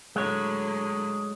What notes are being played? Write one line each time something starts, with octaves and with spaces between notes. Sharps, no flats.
A2 D3 F#3 G#3 C#5